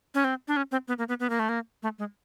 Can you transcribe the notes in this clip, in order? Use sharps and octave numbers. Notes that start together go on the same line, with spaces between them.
C#4
C4
D4
C#4
C4
B3
A#3
B3
B3
A#3
A3
A#3
A3
G#3